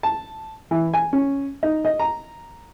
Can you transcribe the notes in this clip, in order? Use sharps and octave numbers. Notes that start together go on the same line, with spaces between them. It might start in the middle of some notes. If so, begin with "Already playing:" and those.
A5
E3
G#5
C#4
D#4
D#5
A#5